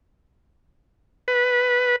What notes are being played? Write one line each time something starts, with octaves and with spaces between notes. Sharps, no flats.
B4